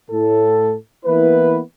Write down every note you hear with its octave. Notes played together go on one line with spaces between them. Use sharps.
A2 A4
E3 A#3 B3 E4 B4